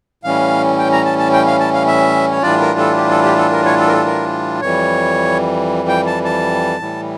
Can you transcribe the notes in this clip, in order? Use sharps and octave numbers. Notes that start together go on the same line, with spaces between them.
A2 E3 G3 C#4 F5
G5
A#5
A5
A5
G5
F5
A5
F5
E5
C#5
A2 E3 G3 D4 F4 D5
A#4
A4
G4
A4
G4
A4
A#4
C#5
A4
A#4
A4
A#4
F2 E3 G3 C#5
G5
A5
A5
A2 E3 G3